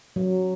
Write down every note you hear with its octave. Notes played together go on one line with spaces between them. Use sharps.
F#3